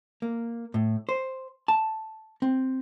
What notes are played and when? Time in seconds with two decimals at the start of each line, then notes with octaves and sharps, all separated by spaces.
0.22 A#3
0.74 A2
1.09 C5
1.68 A5
2.42 C4